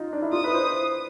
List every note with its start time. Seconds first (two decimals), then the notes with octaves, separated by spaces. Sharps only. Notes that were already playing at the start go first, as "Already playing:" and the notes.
Already playing: D#4 F4
0.13 D4
0.22 E4
0.33 F4 D#6
0.44 B4
0.54 C5